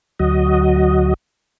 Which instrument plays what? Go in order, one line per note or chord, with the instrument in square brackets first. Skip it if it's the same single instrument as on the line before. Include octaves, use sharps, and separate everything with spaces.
[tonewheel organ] D2 F#3 F#4 D#5